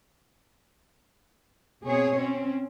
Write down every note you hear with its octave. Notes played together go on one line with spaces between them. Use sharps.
B2 C4 G#4 C#5
C4 C#4